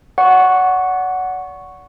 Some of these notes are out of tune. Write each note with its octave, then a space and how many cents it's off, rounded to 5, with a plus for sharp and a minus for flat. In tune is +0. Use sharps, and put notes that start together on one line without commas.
D5 -40 F#5 +0 C#6 +0